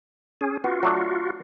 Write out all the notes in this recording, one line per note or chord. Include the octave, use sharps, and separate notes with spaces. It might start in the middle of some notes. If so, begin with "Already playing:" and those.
C#4 G#4
B3 F4 F#4
F#3 A3 D4